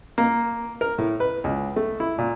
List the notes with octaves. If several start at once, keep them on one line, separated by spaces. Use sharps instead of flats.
A#3
A#4
A2
B4
C#2
A3
E4
A#2